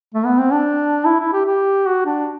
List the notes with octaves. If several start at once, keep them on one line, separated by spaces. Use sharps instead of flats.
A3
B3
C4
D4
E4
E4
G4
G4
F#4
D4